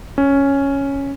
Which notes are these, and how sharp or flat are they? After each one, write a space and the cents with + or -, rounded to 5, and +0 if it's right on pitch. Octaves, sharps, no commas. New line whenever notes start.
C#4 +0